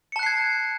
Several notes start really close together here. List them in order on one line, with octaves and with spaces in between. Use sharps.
C#7 A5 F#6 C7 G#6